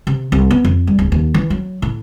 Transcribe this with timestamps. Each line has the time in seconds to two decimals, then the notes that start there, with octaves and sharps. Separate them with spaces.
0.07 C3
0.32 C2
0.51 B3
0.65 F2
0.87 G3
0.99 D1
1.12 D#2
1.34 E3
1.50 F#3
1.82 A2